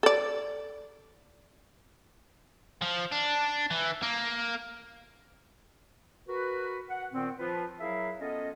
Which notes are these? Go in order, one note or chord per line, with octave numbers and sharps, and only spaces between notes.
A4 D5
F3
D4
E3
A#3
F#4 A#4 B4
F#5
A#2 D#3 B3 C4
F3 F4 B4
F#3 E4 G#4 A#4 E5 F5
B3 C#4 F4 A4 D#5